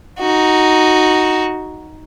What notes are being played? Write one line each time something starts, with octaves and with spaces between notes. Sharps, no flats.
D#4 F#4